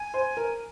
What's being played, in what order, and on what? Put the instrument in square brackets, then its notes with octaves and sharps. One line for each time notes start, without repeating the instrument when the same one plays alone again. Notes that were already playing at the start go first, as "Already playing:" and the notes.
Already playing: [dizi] G#5
[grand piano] C5
A#4